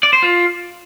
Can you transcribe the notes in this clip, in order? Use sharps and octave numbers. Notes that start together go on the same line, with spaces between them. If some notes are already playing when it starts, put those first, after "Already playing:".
D5
C5
F4